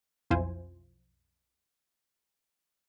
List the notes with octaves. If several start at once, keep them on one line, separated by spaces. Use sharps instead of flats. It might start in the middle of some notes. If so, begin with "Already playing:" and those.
B1 F2 E4 F4 C5 G#5